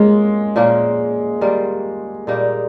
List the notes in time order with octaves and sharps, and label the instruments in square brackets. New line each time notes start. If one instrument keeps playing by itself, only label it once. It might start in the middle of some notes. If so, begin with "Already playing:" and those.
Already playing: [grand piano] G#3 [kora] A#3 C#4 F4
[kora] A#2 F3 A#3 C#4
D#3 G3 A#3 F4
A#2 G3 A#3 D#4